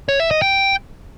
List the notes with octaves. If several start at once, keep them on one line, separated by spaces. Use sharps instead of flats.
C#5
E5
D#5
G5